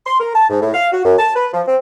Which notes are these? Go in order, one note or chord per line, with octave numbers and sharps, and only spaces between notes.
C6
A#4
A5
G#2
A2
F5
F#4
F#2
A5
B4
F3
C4